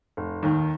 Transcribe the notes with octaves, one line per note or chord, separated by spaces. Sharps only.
F1
D#2 D#3